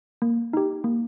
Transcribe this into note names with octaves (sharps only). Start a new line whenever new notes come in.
A#3
D#4 G4
A#3